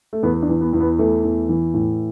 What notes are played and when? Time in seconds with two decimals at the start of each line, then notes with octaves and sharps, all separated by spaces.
0.13 A3
0.23 E2 B3
0.42 D4
0.49 E3
0.61 B3
0.73 E2
0.80 B3
0.99 E3 A3
1.24 E2
1.49 E3
1.74 A2